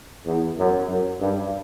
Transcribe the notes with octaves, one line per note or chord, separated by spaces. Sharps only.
E2
F#2
F#2
G2